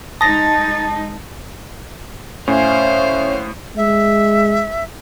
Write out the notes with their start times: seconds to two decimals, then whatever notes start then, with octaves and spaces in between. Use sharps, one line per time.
0.21 G#3 D#4 A5 D#6 A6 A#6
2.48 A2 C#4 C5 E5 F5
3.77 G#3 E5